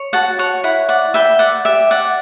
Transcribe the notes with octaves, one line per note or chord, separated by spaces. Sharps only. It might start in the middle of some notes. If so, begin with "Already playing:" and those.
Already playing: C#5
F#4 F#5 A5
C#5 F#5
E4 F#5
D5 F#5
B4 E5 G5
D5 F#5
G4 E5
D5 F#5